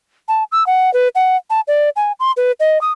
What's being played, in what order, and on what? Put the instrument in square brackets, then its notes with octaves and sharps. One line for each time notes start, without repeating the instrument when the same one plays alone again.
[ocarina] A5
E6
F#5
B4
F#5
A5
D5
G#5
C6
B4
D#5
D#6